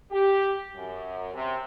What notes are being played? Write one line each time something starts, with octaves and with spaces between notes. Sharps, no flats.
G4
F#2
C3